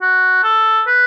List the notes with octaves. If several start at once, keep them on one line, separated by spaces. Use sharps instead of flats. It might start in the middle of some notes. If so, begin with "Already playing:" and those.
F#4
A4
B4